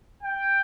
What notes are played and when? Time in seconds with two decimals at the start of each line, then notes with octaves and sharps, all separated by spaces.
0.23 G5